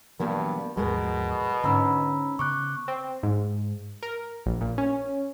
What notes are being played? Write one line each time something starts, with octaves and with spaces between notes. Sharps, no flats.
G2 B2 E3 F#3 G3 A#3 B3
D#2 G#2 B2 F3 G#3 A#4
G#2 D3 C#4 A#5 B5 E6
C#3 B3 C#6 D6 F#6
C4
G#2
A#4
A#1
A#2
C#4